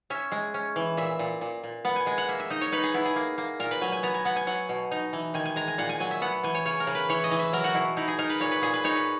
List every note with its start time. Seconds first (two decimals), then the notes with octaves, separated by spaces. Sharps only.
0.10 C#4 E5
0.32 G#3
0.54 C#4
0.76 E3
0.97 A#2 E5
1.19 A#2
1.41 A#2
1.63 A#2
1.85 B3 F#5
1.96 G#5
2.06 G#3 G#5
2.18 F#5
2.28 A#3 E5
2.40 E5
2.50 D#4 D#5
2.61 C#5
2.72 D#4 B4
2.83 G#4
2.94 B3 E4
3.05 G#4
3.16 A#3
3.38 A#3
3.60 A#2 A#4
3.71 B4
3.81 F#3 G#5
3.92 G#5
4.03 B3 A#5
4.14 G#5
4.25 B3 F#5
4.36 G#5
4.47 F#3 F#5
4.69 B2
4.91 D#4
5.13 E3
5.34 D#3 G#5
5.46 G#5
5.56 G#3 A#5
5.68 G#5
5.78 A#2 F#5
5.89 G#5
6.00 F#3 G#5
6.11 E5
6.22 B3 F#5
6.43 E3 G#5
6.55 C#5
6.65 C#3 C#5
6.80 A#4
6.87 C#3
6.95 B4
7.09 E3 C#5
7.24 D#5
7.31 E3
7.39 E5
7.53 F#3 A#4
7.64 F#4
7.74 B2 E4
7.97 D#4 E4
8.08 G#4
8.19 D#4 A#4
8.30 B4
8.40 A#2 C#5
8.51 B4
8.62 A#2 G#4
8.73 B4
8.84 D#4 C#5
8.95 B4